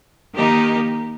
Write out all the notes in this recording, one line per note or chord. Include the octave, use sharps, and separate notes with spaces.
D#3 A#3 D#4 G4